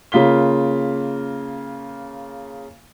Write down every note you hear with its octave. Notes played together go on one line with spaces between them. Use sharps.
C#3 A#3 F4 B6 G7